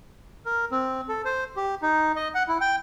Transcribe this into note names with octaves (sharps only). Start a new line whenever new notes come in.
A#4
C4
A4
C5
G4
D#4
D#5
F#5
E4
G5